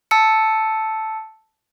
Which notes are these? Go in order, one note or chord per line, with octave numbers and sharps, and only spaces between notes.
A5 E6 C#7